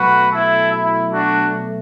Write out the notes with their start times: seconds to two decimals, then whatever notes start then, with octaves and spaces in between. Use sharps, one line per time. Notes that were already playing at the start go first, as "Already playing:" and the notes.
Already playing: B2 F#3 A3 F#4 B4
0.32 E4 A4
0.72 E4
1.12 D4 F#4